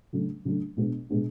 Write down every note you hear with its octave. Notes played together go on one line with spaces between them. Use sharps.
C#3 F#3 A3 D4
C#3 F#3 A3 D4
B2 G#3 B3 D4
B2 G#3 B3 D4